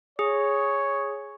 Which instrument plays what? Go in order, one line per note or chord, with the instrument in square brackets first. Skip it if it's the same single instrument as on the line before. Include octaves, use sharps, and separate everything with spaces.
[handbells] G#4 [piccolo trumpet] C#5